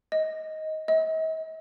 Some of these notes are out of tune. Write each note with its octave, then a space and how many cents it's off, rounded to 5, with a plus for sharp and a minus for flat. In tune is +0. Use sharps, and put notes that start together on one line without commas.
D#5 +15
D#5 +45